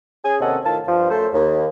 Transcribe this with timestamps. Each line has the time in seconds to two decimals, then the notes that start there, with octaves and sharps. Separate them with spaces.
0.24 C#4 G#4 G#5
0.41 D#2 C3 C#4 A4 D#5 F#5
0.65 A2 D#3 F4 A5
0.86 G2 F3
1.10 F#2 A3 A4 C5
1.33 D#2